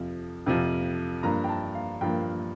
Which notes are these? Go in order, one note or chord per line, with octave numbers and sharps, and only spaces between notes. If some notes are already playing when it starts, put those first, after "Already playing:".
Already playing: F2 C3 F3
F2 C3 F3
G2 F3 A#3 A#5
G5
A5
F5
G2 F3 A#3 G5